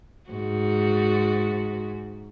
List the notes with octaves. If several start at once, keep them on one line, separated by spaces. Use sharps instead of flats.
G#2 F#4